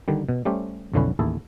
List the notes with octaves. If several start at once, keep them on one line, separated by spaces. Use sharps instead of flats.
D3 D#3 G3
B2
G3 A3 C#4 G4 C5
B1 F2 D3 E3 C#4 B4
A1 D#2 E4 G#4 A4 A5